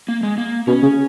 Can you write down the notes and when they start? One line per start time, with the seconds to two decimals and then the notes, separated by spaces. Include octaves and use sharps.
0.08 A#3
0.23 G#3
0.38 A#3
0.67 B2 C#4
0.82 C#3